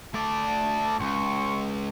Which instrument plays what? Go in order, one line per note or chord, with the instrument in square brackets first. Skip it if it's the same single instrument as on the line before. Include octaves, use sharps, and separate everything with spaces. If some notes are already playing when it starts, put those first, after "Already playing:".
[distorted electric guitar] A3 D5 [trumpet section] A5
[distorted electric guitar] C#2 [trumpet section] C6 C#6